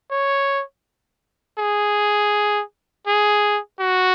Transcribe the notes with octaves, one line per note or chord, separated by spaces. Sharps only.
C#5
G#4
G#4
F#4